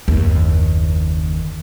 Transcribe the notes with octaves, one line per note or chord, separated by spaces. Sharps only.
F#1 D#2